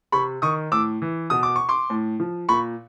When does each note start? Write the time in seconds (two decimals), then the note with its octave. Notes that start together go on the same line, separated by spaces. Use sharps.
0.12 C3 B5 C#6
0.42 D#3 C#6 D#6
0.72 A2 D6 E6
1.02 E3
1.30 B2 D#6
1.43 D6
1.56 C#6
1.69 C6 D6
1.90 A2
2.20 F3
2.49 A#2 B5 C#6